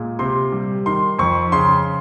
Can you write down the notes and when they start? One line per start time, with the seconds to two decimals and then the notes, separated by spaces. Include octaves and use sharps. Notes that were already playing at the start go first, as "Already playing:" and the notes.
Already playing: A#2 G#3
0.19 C3 C6
0.52 G3
0.86 D#3 C6
1.19 F2 C#6
1.52 C#3 C6